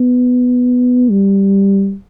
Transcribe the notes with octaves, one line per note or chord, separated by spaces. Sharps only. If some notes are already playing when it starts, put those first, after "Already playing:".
Already playing: B3
G3